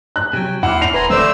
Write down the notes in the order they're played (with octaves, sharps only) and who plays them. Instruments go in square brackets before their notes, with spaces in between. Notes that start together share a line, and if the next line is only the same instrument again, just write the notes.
[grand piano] F#6
[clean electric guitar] C3 F#3 [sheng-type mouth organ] G5 G#5
[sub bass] D#2 [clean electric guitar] E4 [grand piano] F#5 [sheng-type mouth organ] C6 D6 F6
[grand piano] C7 F7
[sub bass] D#1 [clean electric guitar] B4 [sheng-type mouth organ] G#5 A#5 C6
[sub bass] D3 [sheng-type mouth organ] A3 C5 E6 [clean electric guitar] C4 D5